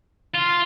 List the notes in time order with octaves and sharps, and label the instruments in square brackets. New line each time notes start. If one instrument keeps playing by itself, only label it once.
[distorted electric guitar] F4